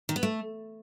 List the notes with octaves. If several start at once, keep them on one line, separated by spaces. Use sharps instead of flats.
D#3
B3
A3